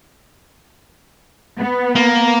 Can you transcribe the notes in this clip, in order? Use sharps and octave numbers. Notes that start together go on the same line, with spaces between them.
B3
A#3